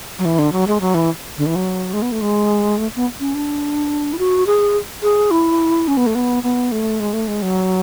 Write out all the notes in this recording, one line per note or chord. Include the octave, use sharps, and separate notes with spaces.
F#3
E3
D3
F#3
G#3
F#3
E3
D3
E3
F#3
G#3
B3
A3
G#3
A3
B3
C#4
D4
E4
F#4
G#4
G#4
E4
C#4
B3
A3
B3
B3
A3
G#3
A3
G#3
F#3